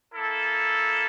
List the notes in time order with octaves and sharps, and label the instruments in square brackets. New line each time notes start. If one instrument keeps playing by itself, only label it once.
[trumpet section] A#3 E4 A4